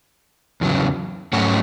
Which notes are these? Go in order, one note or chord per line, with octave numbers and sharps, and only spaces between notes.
E2 C#3 F#3
G#2 F#3 A3 C#4 F#4